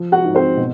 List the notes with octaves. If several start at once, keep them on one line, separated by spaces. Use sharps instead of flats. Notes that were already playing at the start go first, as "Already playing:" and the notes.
Already playing: F3
F#4 F#5
G#2
C4 C5
B2